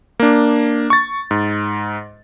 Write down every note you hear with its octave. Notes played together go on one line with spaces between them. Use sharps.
A#3 D4
C#6 A6
G#2